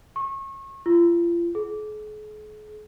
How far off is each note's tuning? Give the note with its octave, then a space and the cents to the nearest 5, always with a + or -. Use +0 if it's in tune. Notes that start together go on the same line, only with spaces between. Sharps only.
C#6 -30
F4 -35
G#4 +45